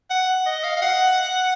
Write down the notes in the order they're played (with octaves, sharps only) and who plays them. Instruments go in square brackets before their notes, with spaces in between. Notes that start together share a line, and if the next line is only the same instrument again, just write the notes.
[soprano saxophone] F#5
D#5
F5
F5
F#5